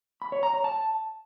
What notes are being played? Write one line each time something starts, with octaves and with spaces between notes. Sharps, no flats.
B5
C#5
A#5
C#5
A5